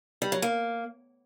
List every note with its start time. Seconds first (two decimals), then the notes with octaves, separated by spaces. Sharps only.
0.22 G3
0.32 F#3
0.42 A#3